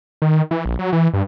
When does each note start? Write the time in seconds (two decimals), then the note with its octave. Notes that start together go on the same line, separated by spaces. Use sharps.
0.22 D#3
0.51 E3
0.65 A#1
0.79 F#3
0.93 E3
1.14 G2